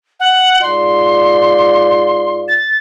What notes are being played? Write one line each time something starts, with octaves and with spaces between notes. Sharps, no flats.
F#5
G#2 F4 D5 C6
A6